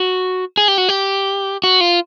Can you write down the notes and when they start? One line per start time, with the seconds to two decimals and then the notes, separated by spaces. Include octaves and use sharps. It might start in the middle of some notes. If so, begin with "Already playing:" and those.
Already playing: F#4
0.57 G#4
0.68 G4
0.78 F#4
0.89 G4
1.64 F#4
1.81 F4